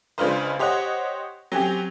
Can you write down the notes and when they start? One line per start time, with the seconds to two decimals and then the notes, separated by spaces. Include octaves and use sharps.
0.18 C#2 C#3 D4 F4 B4 C5
0.59 G4 C5 C#5 D#5 F#5
1.52 F#3 C4 C#4 G4